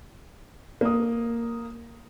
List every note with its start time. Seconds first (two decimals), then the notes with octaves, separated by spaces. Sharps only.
0.81 A#3 D#6